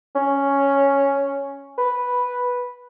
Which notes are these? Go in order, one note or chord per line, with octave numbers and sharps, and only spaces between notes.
C#4
B4